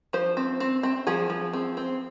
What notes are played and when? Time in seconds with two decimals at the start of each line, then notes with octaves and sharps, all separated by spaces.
0.13 F3 C5
0.37 C4
0.60 C4
0.83 C4
1.07 F3 G#4
1.30 F3
1.53 C4
1.77 C4